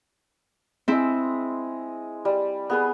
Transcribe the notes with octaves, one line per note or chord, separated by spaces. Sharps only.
G#3 C4 E4 G#4
G3
B3 G#4 B4